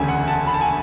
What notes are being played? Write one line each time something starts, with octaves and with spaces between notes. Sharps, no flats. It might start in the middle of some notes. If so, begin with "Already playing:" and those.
Already playing: E1 D2 C#3 G#5
F#5
A5
B5
A5
G#5